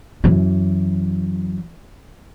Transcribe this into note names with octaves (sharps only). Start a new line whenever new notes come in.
F#2 E3